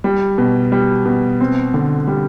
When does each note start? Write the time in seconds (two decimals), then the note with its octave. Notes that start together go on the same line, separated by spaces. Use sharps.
0.04 G3
0.38 B2
0.72 G3
1.05 B2
1.40 C4
1.74 D3
2.07 G3